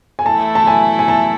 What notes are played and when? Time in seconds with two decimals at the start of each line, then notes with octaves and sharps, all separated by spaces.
0.19 G#5
0.25 E3 A3 E4 A4 A5
0.55 A5
0.67 G#5
0.99 G#5
1.08 A5